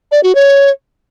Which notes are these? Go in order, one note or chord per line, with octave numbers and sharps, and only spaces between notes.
D5
F#4
C#5